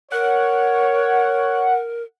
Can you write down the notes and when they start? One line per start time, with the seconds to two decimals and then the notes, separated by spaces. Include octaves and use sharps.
0.12 A#4 C#5 F#5